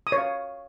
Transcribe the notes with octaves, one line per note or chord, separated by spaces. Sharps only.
D#6
C#5
F5